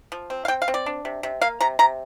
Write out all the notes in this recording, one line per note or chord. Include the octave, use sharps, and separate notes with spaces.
F3
C4
F5
C4 G5
F5
C4
D5
D4
C3
C3
A#3 F5
C3 A#5
C3 A#5